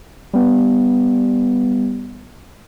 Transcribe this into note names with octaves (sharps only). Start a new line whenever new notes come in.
G3 B3